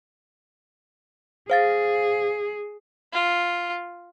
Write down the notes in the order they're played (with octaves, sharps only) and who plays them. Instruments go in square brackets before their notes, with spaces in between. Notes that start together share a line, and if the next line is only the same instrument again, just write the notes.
[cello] G#4 [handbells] C5 F5 A6
[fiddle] F4